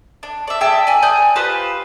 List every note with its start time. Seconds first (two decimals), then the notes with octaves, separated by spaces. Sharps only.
0.23 D4
0.48 D5 E5
0.61 G#4 E5 G5 A5
0.87 D5 G#5
1.02 D5 G#5 D#6 G6
1.35 F4 G4 B4 C5